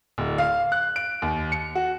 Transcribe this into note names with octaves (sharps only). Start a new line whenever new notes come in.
D1
F5
F#6
D7
D#2
C#7
F#4